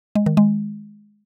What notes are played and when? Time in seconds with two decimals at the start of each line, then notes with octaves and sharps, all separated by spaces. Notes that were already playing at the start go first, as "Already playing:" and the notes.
0.15 G#3
0.26 D#3
0.37 G#3